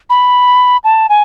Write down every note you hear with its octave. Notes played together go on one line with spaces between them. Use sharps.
B5
A5
G#5